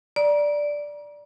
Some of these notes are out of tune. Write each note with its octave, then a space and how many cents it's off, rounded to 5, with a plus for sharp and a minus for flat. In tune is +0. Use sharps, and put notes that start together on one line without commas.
D5 +0 A#5 +30